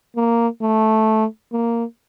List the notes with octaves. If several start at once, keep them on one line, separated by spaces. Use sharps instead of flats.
A#3
A3
A#3